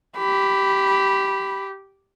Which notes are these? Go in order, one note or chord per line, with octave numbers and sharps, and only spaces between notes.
G4 B5